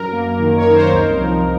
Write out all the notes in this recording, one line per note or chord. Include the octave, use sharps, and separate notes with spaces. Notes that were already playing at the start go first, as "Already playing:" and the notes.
Already playing: F#2 A#4
A#3
D#3
C#5
D#4
C5
C2 A#4
F3